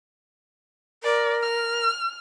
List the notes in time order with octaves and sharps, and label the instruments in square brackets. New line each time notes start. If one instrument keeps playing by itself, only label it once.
[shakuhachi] A#4 [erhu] D5
[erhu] F6